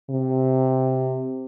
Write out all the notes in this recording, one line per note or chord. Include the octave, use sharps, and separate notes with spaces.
C3